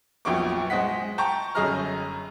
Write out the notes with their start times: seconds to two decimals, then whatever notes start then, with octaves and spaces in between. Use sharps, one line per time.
0.25 A#1 F2 F#3 B3 C#6 D6
0.70 G#3 C5 D#5 F#5 B6
1.18 G5 A5 A#5 C#6 G6
1.55 G1 F#2 G#4 D#5 A#5 F6